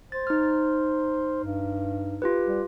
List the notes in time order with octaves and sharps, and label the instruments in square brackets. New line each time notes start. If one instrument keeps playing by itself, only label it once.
[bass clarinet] C5 [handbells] A6
[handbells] D#4 F6
[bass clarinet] G2
[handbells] F4 G4 B4
[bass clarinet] G3